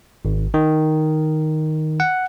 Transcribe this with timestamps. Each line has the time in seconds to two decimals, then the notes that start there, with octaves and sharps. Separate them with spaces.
0.25 G#1
0.54 D#3
2.00 F#5